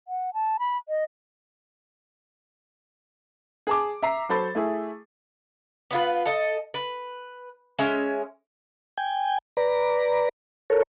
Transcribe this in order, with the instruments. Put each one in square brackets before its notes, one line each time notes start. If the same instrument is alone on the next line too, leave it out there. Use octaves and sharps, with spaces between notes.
[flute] F#5
A5
B5
D#5
[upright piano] G#4 A5 D6
E5 A#5 C7
F#3 A4 C5 B5 A6
A3 E4 G#4
[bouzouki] B3 F4 B4
A4 D#5
B4
G#3 C#4 E5
[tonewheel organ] G5 G#5
B4 D5 A#5
A4 A#4 C#5